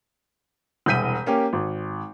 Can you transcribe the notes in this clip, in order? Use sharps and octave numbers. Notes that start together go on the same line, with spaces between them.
E1 C2 G6 B6 D#7
A#3 C#4 G4
G#1